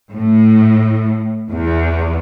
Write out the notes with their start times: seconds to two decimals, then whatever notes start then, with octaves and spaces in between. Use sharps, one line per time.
0.13 A2
1.48 E2